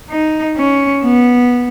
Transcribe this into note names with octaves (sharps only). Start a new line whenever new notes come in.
D#4
C#4
B3